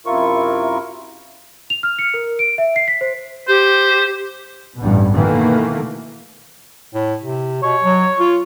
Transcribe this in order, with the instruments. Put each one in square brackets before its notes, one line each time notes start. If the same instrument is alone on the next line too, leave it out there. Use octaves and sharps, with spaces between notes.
[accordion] F#2 C3 E4 F4 A#4 C#6
[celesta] F7
F6
C#7
A#4
D7
E5
C7
B6
C5
[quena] G4 [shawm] C5
[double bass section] A1 G2 B2
B2 D#3 E3 A3 A#3
[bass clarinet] A2
C3
[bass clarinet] B2 [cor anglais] C#5
[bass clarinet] F#3
F4